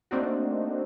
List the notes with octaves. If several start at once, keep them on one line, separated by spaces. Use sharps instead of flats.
A3 A#3 C4 D4 D#4 F#4